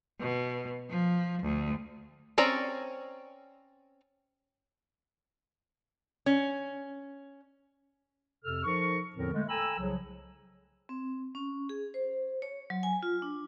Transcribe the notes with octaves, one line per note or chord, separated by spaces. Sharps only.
B2
F3
D2
C4 C#4 D5 A#5
C#4
F2 C3 A4 E6 F6
F3 D#4 A4 A#4 C#6
E2 A2 D3 F3 C4 A#4
D3 G#3 A3
A4 G5 G#5 A#5 B5 E6
C2 C#3 F3 F#3
C4
C#4
G#4
C5
C#5
F#3
G#5
F4
D4